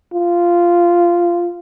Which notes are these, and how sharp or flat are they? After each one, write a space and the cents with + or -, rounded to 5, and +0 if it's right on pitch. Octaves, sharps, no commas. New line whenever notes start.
F4 -10